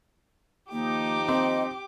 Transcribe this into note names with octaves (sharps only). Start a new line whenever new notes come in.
D#2 F3 A#3 D#4 G4 D6
C4 D#5